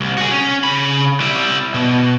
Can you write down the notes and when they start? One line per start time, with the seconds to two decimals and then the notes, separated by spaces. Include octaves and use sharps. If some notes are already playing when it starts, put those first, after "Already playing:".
0.01 C2
0.18 F#4 G#4
0.31 C#4
0.64 C#3 B5
1.20 G3 E4
1.74 B2